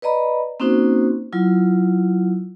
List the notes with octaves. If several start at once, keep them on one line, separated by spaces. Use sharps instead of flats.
B4 D5 D#5 A#5 B5
A#3 C4 C#4 D#4 F#4 C5
F#3 E4 F4